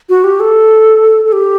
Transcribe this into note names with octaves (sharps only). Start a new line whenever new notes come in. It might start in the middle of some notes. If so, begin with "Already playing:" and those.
F#4
G4
A4
A4
G4